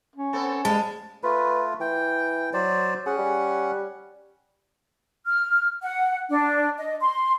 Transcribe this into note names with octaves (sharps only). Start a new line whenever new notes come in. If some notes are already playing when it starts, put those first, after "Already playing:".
C#4
B3 C4 A4
G3 G#3 A#3 A5
A3 F4 B4
E3 G5
F#3 C5 D5
C#4 G#4 F#5
G3
F6
F#5
D4
D#5
C6